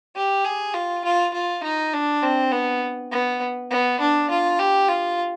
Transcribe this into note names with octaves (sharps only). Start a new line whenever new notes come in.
G4
G#4
F4
F4
F4
D#4
D4
C4
B3
B3
B3
D4
F4
G4
F4